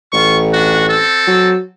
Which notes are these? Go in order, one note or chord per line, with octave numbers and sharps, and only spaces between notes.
A1 F4 C#6
D4 F#4
C4 A4
F#3